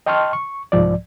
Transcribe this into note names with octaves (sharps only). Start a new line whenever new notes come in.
D#5 G5 A5 C6 C#6 F6
C#6
C2 G#2 F3 D5